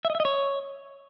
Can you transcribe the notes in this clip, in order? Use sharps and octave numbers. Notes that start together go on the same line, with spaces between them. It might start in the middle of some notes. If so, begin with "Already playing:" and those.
E5
D#5
E5
D#5
C#5